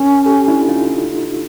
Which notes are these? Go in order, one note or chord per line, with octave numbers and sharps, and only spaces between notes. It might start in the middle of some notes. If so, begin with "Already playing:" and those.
Already playing: C#4 A#4
G4 A4
D4 E4
D#4 F4